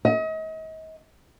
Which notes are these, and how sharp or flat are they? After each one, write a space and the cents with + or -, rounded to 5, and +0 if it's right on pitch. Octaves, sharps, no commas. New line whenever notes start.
D#5 +35